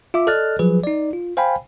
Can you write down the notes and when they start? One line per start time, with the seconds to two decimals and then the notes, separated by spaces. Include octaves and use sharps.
0.14 F4 E5 D6
0.27 A4 D5 D#5 F6 F#6 A6
0.59 F3 F#3 G#4 B4
0.84 D#4 D5
1.13 F4
1.37 C5 F5 G5 G#5 B5